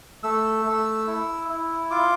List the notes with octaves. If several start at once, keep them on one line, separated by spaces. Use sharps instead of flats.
A3 E6
A3
E4
E4
F4 D6